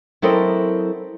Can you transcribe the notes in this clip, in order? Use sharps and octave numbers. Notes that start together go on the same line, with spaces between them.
F#3 C4 E4 A4 A#4 D#5